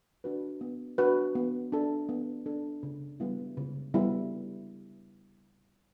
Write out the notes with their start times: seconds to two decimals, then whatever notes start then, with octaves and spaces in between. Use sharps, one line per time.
0.24 D4 F#4 B4
0.61 B3
0.98 D4 F#4 B4
1.35 B3
1.72 D4 A4
2.09 B3
2.46 D4 A4
2.83 C#3
3.20 G3 B3 E4
3.57 C#3
3.94 G3 B3 E4